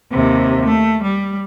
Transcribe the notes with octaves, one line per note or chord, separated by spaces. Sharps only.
D#2 C3
A3
G3